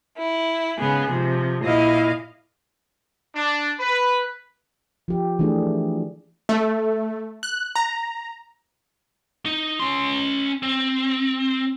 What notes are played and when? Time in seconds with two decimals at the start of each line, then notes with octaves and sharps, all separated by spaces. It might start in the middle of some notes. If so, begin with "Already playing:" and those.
0.18 E4
0.78 G#2 C#3 B3 G#4
1.10 C3 F3
1.62 A#2 E4 D#5 F5
3.36 D4
3.79 B4
5.08 F3 G4
5.39 E3 A3 D4 G#4
6.49 A3
7.43 F#6
7.76 A#5
9.45 D#4
9.80 C#4 C6
10.63 C4